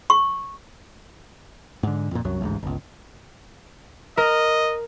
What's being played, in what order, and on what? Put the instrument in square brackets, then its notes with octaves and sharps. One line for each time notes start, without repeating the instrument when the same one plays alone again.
[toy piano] C#6
[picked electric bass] G#2 D3
F2 A#2
C2 F#2 F#3
A1 D2 G#2
G1 C#2
[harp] A#4 [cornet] D#5